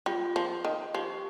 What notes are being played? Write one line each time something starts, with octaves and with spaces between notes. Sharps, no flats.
G3 F4
F3
D#3
F3 G4